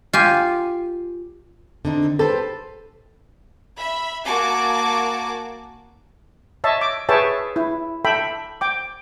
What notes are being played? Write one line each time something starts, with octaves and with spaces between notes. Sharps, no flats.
F4 G4 G#5
D3 C4 D#4
G4 A4 B4 C5
E5 B5
A#3 F#4 G#5 A5 D6
C#5 D#5 E5 A5
D6
G#4 B4 C#5 E5 G5 A5
E4
A4 E5 G5 B5
G5 D6